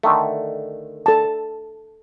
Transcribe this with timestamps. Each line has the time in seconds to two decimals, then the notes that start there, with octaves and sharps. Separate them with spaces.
0.03 D3 D#3 A3
1.06 A4 A5